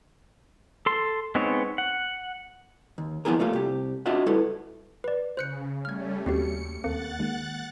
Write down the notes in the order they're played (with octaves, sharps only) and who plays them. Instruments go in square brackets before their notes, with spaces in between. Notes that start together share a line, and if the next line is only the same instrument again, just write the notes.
[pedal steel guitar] A4 C6
G#3 B3 C4 D#4 C#5
F#5
[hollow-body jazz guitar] D#2
F3 F#3 B3 E4 G#4 A#4
G3 A3 A#3 F4
C2 G4
D4 F4 F#4 D#5 E5 F#5
G3 E4 A4 B4
[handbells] B4 D5
[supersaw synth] C#3 [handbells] C5 F#6 C#7
[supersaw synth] G3 A3 C#4 [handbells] F6 G#6
[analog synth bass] D#2 [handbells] C4 F#4 G4 [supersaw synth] C#7
[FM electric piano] D#2 A4 C#7 [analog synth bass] A#3 [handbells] C4 [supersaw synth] F#5 F#6 A6
[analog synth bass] D#2 [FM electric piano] G#3 A#3